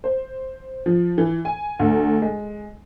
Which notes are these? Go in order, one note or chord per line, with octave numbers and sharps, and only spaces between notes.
C5
F3
E3
G#5
D2
G#3